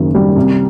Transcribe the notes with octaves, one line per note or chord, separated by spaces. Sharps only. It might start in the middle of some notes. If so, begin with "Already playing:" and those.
Already playing: F#1 F#2 D#3
G3
C2